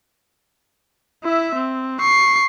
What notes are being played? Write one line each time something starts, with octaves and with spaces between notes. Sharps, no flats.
E4 E5
C4
C#6 C7